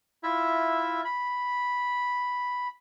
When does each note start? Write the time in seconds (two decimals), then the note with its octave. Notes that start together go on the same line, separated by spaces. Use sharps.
0.23 E4 F4 E5
1.05 B5